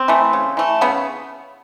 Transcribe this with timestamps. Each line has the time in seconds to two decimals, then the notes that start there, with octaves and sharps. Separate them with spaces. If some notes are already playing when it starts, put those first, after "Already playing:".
Already playing: C4
0.08 E3 A3
0.33 C#3
0.57 E3 A3
0.81 C#3 B3